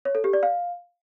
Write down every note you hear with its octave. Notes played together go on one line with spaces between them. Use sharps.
C#5
A4
G4
D5
F5